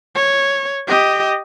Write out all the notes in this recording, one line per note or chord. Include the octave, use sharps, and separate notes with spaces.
C#5
G4 D#5